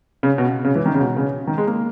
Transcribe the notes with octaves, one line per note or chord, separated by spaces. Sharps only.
C#3
B2
C#3
E3
D#3
C#3
B2
C#3
D#3
G#3
A#3